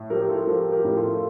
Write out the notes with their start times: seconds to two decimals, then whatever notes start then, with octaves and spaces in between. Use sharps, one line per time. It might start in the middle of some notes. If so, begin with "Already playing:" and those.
Already playing: A2
0.10 F3 G4 A#4
0.29 F4 A4
0.47 F3 G4 A#4
0.72 G4 A#4
0.85 A2
0.97 F4 A4